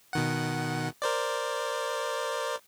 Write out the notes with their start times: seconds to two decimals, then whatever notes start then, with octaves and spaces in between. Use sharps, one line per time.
0.13 B2 D#3 F#5
1.02 A#4 C5 D5